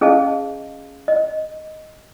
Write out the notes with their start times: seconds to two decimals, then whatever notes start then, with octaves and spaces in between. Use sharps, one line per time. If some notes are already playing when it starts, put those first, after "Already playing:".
0.01 C#4 G#4 D#5 F5 A5
1.08 D#5